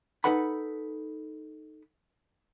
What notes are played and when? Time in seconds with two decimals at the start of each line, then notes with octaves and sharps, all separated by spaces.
0.24 D#4 A4 B4 F#5 B5